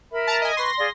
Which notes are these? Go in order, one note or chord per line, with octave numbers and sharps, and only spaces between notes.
A#4 E5 B5
A5 A#5
D#5 G#5
B4 C6 C#6 A#6
G#4 D5 F5